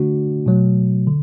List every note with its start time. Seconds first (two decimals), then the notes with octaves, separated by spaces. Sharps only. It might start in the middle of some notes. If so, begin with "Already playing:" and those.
Already playing: D3 A3 D4 F#4
0.46 B2 F#3 A3
1.07 D3